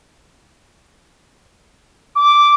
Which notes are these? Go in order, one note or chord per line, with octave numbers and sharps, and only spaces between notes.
D6